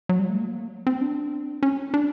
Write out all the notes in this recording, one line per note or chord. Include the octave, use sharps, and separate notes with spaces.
F#3
G3
A3
A#3
C4
D4
C#4
D4